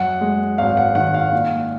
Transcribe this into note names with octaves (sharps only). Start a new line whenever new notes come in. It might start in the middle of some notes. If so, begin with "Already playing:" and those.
Already playing: F#2 F#5
G#3
G#1 F5
F#5
D#3 F#5
F5
A#2